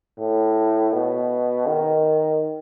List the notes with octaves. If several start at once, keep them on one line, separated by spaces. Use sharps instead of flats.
A2
B2
D#3